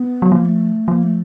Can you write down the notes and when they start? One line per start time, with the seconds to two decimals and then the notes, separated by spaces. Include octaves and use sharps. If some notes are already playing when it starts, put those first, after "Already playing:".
Already playing: B3
0.22 F#3
0.31 F3 A#3
0.45 A3
0.88 F3 A#3
1.03 A3